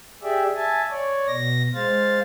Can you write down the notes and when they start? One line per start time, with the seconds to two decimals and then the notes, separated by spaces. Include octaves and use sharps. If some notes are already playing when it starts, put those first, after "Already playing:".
0.23 G4 G#4 D5 E5
0.56 E5 G#5 A5
0.90 C#5 D5
1.28 B2 A#6
1.74 G#3 C5 F5 A6